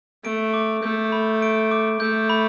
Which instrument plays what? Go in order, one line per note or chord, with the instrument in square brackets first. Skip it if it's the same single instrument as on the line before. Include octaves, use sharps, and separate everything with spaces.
[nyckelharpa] A3 [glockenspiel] D7
[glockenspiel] D6
[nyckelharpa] A3 [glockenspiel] G6
[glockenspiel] B5
D7
D6
[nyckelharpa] A3 [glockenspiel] G6
[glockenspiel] B5